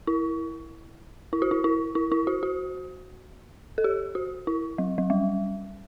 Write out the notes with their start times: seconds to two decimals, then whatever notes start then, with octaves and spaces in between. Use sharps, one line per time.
0.07 E4
1.33 E4
1.42 F#4
1.51 E4
1.64 E4
1.95 E4
2.12 E4
2.27 F#4
2.43 F#4
3.78 A4
3.84 G4
4.15 F#4
4.47 E4
4.78 F#3
4.98 F#3
5.10 G3